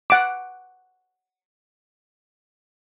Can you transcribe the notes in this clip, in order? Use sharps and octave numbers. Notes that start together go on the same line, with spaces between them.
F#5 D6